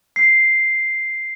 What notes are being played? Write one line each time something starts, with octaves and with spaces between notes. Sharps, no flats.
C7